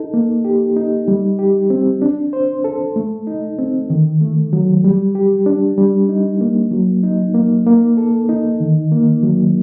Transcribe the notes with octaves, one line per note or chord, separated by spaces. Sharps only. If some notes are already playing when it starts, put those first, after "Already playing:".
Already playing: D#4 A4
A#3
G4
D#4
G3
G4
C4
D4
C5
A4
A3
D#4
C4
D#3
A3
F#3
G3
G4
D4
G3
D#4
A#3
F#3
D#4
A#3
A#3
A4
D#4
D#3
A#3
F#3